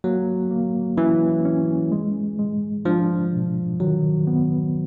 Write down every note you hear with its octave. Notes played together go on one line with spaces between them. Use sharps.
F#3 A#3
A#3
E3 C#4
C#4
G#3
G#3
F3 D4
B2
D#3 F#3
B3